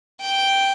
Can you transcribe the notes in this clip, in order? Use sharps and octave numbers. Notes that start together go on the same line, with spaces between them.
G5